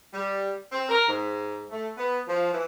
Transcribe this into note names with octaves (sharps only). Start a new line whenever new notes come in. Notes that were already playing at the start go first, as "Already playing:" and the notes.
G3
C4
A#4
G#2
A3
B3
F3
E3